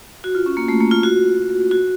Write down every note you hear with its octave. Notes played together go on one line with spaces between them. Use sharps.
F#4
F4
C#4
A#3
A3
A#3
F4
F#4
F#4